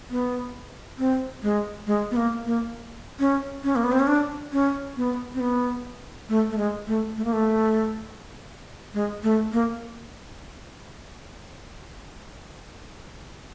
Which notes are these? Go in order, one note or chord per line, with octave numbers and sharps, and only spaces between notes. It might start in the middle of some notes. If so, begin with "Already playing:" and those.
B3
C4
G#3
G#3
B3
A#3
A#3
C#4
C#4
A#3
B3
C4
C#4
D4
C#4
B3
C4
B3
A3
A3
G#3
A3
A3
A#3
A3
G#3
A3
A#3